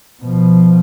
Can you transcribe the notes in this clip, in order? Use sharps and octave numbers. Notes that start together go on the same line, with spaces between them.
B2 F3